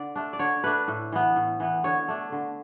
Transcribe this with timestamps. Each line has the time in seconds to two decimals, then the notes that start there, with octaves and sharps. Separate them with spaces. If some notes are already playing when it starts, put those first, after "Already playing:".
Already playing: D3 D5
0.16 A3 D4
0.33 D5
0.39 D3 C#5
0.64 A3 D4 B4
0.88 A2
1.12 E3 B3
1.36 A2
1.60 E3 B3
1.84 D3 C#5
2.08 A3 D4
2.32 D3